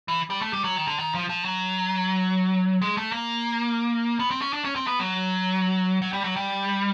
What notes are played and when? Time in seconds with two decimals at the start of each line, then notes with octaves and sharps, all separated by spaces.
0.08 E3
0.30 G3
0.41 A3
0.53 G3
0.64 F#3
0.76 D#3
0.87 D3
0.99 D#3
1.15 F3
1.29 F3
1.45 F#3
2.82 G#3
2.97 A3
3.12 A#3
4.19 B3
4.31 C4
4.41 C#4
4.53 D4
4.65 C#4
4.76 C4
4.87 B3
4.99 F#3
6.02 F#3
6.13 G3
6.24 F#3
6.36 G3